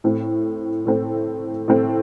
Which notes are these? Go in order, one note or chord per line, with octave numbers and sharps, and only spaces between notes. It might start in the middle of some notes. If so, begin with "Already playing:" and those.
A2 A3 C4
A2 A3 C4
A2 A3 C4